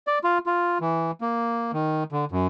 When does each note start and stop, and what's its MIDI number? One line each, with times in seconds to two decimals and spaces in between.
0.07 0.19 74
0.24 0.38 65
0.46 0.78 65
0.81 1.11 52
1.21 1.71 58
1.73 2.04 51
2.12 2.25 50
2.32 2.47 42